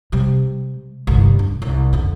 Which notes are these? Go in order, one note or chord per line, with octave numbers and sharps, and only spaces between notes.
C3 G3
G1 C2
D4
C2
F2 D3